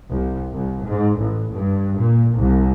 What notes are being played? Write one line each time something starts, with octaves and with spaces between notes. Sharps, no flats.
C2
C2
G#2
A1
G2
A#2
C2